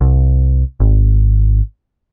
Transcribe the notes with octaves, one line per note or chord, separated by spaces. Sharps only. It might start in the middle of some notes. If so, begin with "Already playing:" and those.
C2
G#1